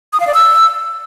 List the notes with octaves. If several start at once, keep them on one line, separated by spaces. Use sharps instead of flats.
D#6
F5
D5
E6